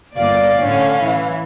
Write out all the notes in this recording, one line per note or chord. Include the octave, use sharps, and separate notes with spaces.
G1 A#3 D5 F5
A2 D3 C#4
E3